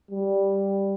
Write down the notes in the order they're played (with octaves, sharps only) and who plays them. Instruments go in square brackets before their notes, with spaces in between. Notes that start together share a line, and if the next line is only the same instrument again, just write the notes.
[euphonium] G3